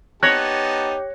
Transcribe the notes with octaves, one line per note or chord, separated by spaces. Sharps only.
B3 D#4 G4 C#5 A5 F#6 A#6